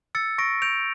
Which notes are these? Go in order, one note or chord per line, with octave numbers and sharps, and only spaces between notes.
E6 A6 C#7
C#6 A#6 D7
G6 D7 F7